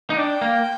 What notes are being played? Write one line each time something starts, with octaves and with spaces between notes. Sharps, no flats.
D#4
D4 G5
A#3